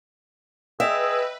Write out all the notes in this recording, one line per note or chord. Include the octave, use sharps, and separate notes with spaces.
G#4 B4 D#5 E5 G5 E6